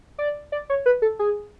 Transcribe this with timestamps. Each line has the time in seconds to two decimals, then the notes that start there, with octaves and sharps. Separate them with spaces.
0.18 D5
0.52 D5
0.70 C#5
0.86 B4
1.02 A4
1.19 G#4